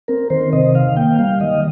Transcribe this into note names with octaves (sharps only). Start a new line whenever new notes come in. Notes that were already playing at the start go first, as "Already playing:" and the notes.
C4 A#4
D#3 C5
C3 D#5
D#3 F5
A#3 G5
G3 F5
D#3 D#5